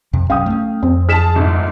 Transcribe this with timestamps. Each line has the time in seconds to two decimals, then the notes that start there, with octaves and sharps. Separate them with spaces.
0.13 F2 C3
0.30 B1 F#2 C#4 F5 G5 D#6
0.46 A3 C#4
0.83 F2 C4
1.09 G#4 A5 F6 B6 E7
1.35 G1 G#2